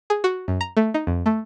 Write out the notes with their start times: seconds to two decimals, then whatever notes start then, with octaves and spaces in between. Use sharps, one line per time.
0.10 G#4
0.24 F#4
0.48 F#2
0.61 A#5
0.77 A3
0.94 D#4
1.07 F2
1.26 A3